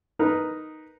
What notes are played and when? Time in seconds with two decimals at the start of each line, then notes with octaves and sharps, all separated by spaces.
0.19 D#4 A#4 B4